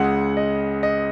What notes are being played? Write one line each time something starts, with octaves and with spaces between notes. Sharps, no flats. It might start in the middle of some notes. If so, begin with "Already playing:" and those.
Already playing: C#2 C#3 G#3 F#5
D#5
D#5